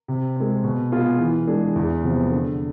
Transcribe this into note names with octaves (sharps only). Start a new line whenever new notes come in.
C3
G#3 C4
B2
B3 F4 G#4
E3
G#3 D4 G#4
E2
C3 F3 B3
D3